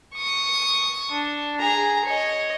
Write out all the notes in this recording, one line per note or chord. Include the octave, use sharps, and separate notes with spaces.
C#6 D#6
D4
G#4 A#5
C#5 D#5